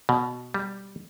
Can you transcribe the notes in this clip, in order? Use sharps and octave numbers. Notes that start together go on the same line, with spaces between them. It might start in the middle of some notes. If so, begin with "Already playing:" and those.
B2
G3